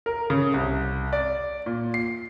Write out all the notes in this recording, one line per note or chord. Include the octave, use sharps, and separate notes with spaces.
A#4
C#3
C2
D5
A#2
C7